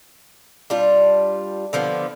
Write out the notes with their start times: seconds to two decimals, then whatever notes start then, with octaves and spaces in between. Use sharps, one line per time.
0.70 G3 D4 F4
1.73 D3 F3 B3